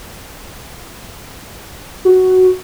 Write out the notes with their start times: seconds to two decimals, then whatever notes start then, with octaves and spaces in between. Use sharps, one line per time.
2.05 F#4